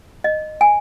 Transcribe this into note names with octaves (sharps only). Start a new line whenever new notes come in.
D#5
G#5